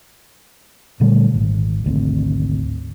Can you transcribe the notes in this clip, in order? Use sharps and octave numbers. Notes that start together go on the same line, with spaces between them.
A#2 D3 G3 A3
G#1
G#1 D2 C4